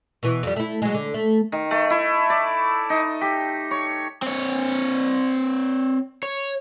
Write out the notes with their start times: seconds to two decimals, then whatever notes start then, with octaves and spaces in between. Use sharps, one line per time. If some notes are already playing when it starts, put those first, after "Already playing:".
0.23 B2 E3
0.43 F2 G3
0.56 A3 E4
0.82 F#3 G#3
0.94 D3
1.14 A3
1.52 D#3
1.71 A3
1.90 E4
2.30 D5
2.90 D#4
3.21 G4
3.71 C#5
4.22 C4 C#5
6.23 C#5